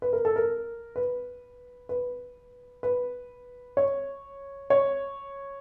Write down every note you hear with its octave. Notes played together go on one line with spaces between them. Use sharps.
B4
A#4
A4
A#4
B4
B4
B4
C#5
C#5